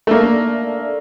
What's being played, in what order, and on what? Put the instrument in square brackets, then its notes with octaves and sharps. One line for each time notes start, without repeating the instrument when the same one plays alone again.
[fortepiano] A3
[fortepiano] A#3 [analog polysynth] D4
[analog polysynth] A3
A3